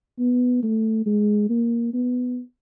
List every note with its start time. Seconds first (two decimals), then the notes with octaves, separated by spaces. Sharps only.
0.19 B3
0.63 A3
1.06 G#3
1.50 A#3
1.94 B3